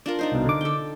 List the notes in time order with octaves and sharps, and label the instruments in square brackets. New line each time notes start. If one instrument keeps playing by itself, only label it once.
[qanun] D4 F4 A#4
D4 D#4 C5
[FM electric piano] C2 B2
D3 D6
[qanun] A4 G5